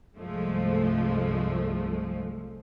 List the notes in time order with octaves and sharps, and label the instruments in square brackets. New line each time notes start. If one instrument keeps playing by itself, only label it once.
[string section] C2 G2 F3 G#3 A3